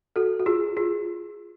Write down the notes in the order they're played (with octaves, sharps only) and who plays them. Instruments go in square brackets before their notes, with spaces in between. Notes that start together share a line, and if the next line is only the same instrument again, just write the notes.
[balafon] F#4 A4
F#4
F4 G#4
F4 G#4